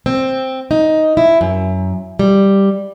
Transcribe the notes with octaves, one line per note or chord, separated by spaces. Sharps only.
C4
D#4
E4
F#2
G3